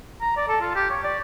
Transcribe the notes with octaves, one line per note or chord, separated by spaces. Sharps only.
A#5
D5
A4
F4
G4
C#5
D5